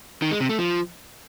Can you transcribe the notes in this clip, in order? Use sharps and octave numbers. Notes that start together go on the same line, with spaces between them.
D#3
G#3
C3
A3
F3